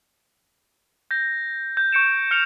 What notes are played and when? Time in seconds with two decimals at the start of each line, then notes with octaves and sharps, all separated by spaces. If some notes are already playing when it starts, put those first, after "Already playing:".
1.11 G6 A#6
1.77 G6
1.92 C#6 G6 C#7 D7 E7
2.31 F6 C#7 E7 F7